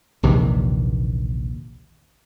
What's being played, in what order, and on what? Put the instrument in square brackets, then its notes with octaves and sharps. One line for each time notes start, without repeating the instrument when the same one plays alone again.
[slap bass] A#1 D#2 C3 E3